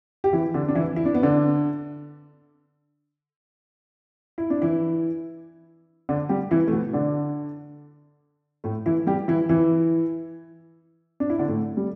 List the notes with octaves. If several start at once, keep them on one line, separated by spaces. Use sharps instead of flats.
G4
E3 E4
D3 D4
D4
E3 E4
E4
D4
B3
D3 D4
E4
D4
E3 E4
D3 D4
G3 G4
E3 E4
A3
B2 B3
D3 D4
A2 A3
E3 E4
G3 G4
E3 E4
E3 E4
D4
E4
D3 D4
A2 A3
G3